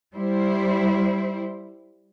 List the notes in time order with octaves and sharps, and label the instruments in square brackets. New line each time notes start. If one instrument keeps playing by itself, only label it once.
[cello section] G3 E4 C5